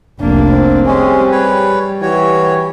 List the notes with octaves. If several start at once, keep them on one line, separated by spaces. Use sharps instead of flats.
F1 C2 A#3 D4
C4
G3 G#3 C#4 G4 G#4
B4 C#5
E3 F#4 G4 C#5